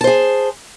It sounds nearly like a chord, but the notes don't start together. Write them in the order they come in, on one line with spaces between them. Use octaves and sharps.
A5 C5 G#4